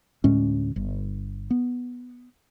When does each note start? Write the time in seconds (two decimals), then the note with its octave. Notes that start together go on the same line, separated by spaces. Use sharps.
0.24 D2 A2 G#3 C#4
0.76 G1
1.51 B3